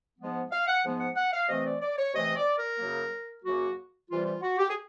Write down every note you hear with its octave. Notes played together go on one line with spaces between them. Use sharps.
G#2 F3 G#3 B3
F5
F#5
G#2 F3 G#3 B3
F#5
F#5
F5
C3 E3 A3 C4 D#5
D5
D5
C#5
C3 E3 A3 C4 D#5
D5
A#4
F#2 C#3 F#3 A#3
F#2 C#3 F#3 A#3 F#4
C3 E3 G3 F4
F4
F#4
G4
G#4